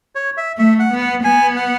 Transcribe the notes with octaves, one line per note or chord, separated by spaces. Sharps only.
C#5
E5
A3 E5
F#5
B3
F#5
B3 G#5
F#5